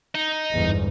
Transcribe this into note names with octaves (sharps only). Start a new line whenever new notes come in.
D#4
G1 E2 G#2